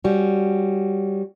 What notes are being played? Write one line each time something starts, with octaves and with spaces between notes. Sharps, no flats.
G3 C#4 F#4